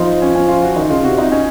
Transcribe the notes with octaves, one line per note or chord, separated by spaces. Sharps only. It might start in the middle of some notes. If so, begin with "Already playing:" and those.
Already playing: F3 C4 D#4 F4
C#4
C#4
F4
F#4
D#3 D#4
C#3 F4
C3 F#4
D#4
C#4